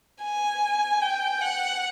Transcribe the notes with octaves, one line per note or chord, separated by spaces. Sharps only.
G#5
G5
F#5